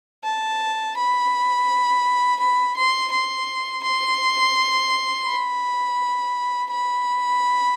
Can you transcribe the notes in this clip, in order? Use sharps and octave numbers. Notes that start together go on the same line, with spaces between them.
A5
B5
B5
C6
C6
C6
B5
B5